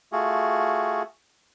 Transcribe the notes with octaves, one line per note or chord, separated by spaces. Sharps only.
A3 F4 F#4 G#4